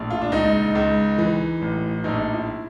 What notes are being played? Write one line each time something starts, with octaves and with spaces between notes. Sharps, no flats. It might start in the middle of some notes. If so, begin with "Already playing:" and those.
Already playing: A#1 A2
F4
D4
C#2 D#4
C#2
E3
A1
A#1 D#4
E4